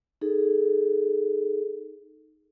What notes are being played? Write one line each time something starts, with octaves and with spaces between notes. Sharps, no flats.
D#4 G#4 A4